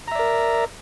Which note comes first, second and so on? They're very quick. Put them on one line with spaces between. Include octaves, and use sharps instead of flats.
A#5 E5 D5 A#4